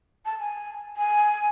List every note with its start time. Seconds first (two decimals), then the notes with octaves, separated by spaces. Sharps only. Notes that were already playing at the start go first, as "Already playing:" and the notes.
0.26 A5
0.40 G#5
0.97 G#5